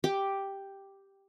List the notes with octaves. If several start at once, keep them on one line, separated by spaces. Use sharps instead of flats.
G4 G5 D6